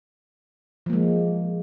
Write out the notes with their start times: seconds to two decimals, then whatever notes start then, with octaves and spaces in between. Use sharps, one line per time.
0.86 F3
0.90 A#3
0.93 G#3